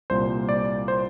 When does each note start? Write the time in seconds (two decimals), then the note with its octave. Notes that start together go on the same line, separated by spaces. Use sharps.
0.10 C2 A#2 G3 C5
0.49 D5
0.88 C5